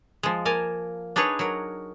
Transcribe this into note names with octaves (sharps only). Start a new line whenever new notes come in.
F3 G#3
A#3 A#4 G#5 A5
D4 D#4 G#4 B4 C#5
F#3 A#4